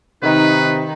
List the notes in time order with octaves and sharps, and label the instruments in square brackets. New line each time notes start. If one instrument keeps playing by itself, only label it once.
[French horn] C3 [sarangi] D#3 [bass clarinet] D#4 [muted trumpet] B4